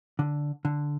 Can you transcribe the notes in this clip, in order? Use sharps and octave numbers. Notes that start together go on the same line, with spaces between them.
D3
D3